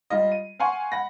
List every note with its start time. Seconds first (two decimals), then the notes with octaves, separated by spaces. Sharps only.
0.10 G3 F4 D#5
0.32 D#7
0.60 F5 F#5 G#5 C6 C#6
0.92 F#5 B5 A#6